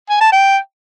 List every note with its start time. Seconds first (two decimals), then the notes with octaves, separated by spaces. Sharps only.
0.09 G#5
0.21 A5
0.32 G5